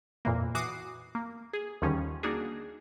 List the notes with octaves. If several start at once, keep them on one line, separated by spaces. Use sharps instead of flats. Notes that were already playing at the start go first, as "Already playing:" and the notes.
F2 A#2 E3 A#3
E3 F#4 D6 D#6 C7
A#3
G#4
D#2 D3 D#3 F3 G3 C#4
A#3 D4 D#4 F#4 G#4